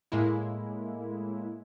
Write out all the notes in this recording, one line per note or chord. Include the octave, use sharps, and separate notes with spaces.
A2 G#3 A#3 E4